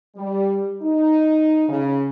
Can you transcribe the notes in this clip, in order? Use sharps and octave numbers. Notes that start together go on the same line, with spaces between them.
G3
D#4
C#3